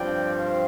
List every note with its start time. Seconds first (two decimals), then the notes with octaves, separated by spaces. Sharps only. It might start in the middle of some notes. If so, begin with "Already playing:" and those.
Already playing: G2 F3 C4 D5 G5
0.35 C5 F5